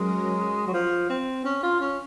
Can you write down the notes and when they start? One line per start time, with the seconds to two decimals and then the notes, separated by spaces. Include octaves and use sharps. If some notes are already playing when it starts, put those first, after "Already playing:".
Already playing: F#3 G#3 C#4 F#4 A#4
0.67 F#3
0.74 F3
1.10 C4
1.45 C#4
1.63 F4
1.80 C#4